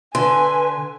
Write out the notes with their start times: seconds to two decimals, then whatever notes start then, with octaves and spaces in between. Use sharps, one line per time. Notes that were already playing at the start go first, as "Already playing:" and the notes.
0.15 D3 B4 G#5 C6